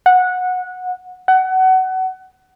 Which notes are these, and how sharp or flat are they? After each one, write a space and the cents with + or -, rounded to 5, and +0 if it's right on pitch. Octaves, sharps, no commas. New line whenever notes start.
F#5 -20
F#5 +20